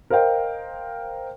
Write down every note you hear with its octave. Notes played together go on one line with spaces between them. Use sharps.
A#4 C5 D#5 F5 G5